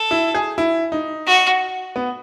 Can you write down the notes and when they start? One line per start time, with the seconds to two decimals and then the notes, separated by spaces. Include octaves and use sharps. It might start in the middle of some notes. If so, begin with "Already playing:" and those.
Already playing: A4
0.11 E4
0.35 G#4
0.58 E4
0.92 D#4
1.27 F#4
1.96 B3